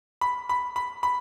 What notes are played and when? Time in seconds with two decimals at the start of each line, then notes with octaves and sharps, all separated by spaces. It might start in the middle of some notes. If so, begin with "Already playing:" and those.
0.21 B5
0.49 B5
0.76 B5
1.03 B5